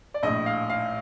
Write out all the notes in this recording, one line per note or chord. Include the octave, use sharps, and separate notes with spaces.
D5
A#1 A2 D#5
F5
F5